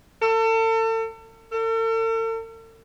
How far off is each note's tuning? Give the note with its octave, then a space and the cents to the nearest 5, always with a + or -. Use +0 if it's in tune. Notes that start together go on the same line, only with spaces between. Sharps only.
A4 +35
A4 +45